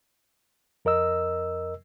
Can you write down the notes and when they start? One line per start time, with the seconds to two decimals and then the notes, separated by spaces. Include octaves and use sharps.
0.85 F2 A#4 D#5 E6